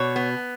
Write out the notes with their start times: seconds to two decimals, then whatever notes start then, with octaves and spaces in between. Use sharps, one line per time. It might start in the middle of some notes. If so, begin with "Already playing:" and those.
Already playing: B2 C#5
0.16 B3